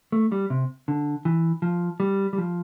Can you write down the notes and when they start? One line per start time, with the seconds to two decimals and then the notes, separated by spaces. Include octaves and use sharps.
0.12 A3
0.32 G3
0.50 C3
0.88 D3
1.25 E3
1.62 F3
2.00 G3
2.33 G3
2.38 F3